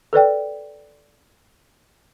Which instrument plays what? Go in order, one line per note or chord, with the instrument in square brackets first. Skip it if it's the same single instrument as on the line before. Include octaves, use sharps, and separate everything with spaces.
[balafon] A4 B4 D5 G5